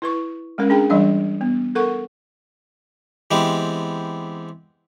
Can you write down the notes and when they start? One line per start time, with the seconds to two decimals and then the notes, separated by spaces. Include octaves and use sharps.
0.02 E4 B4 C#6
0.58 G#3 A3 C#4 A#4
0.70 D4 G#4 G5 A#5
0.90 E3 G3 D4 D5 D#5 F5
1.41 B3
1.75 A4 A#4 F#5 C#6
3.31 E3 G#3 B3 C4 G4